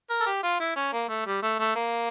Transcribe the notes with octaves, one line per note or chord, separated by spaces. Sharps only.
A#4
A4
G4
F4
E4
C#4
A#3
A3
G3
A3
A3
A#3